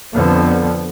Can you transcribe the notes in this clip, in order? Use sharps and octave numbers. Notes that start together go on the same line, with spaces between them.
F2 D3 F3 B3